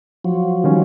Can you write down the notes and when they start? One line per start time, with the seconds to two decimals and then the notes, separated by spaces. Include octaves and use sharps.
0.25 F3 F#3
0.64 D#3 G3 C#4